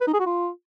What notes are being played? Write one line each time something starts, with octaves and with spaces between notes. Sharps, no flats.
B4
D#4
G#4
F#4
F4